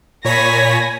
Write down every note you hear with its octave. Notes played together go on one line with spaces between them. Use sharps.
A#2 C#5 G#5 B5 A#6 B6